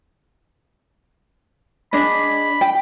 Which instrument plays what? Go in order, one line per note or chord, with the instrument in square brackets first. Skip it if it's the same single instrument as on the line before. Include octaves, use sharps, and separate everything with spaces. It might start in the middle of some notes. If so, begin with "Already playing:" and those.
[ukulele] D4 G#4 D#5 [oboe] B5
[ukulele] G5